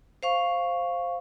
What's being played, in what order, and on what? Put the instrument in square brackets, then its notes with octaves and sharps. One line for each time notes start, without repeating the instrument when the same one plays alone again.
[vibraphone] C5 F5 C#6